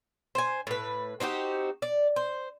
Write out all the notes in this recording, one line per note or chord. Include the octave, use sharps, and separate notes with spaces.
C5 G#5
A2 B4
C4 D#4 F#4 G4
D5
C5